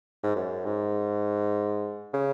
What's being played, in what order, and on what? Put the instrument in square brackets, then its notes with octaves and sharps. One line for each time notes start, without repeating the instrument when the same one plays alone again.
[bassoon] G#2
F#2
G#2
C#3